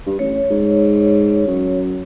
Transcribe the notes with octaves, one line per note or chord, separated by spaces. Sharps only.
G2
A1 C#5
G#2
F#2